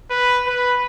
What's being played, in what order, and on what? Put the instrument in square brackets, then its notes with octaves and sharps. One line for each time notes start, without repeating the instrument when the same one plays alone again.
[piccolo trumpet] B4
B4